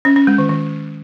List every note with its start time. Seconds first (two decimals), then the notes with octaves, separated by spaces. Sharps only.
0.05 C#4
0.16 C#4
0.27 G#3
0.38 D#3
0.49 D#3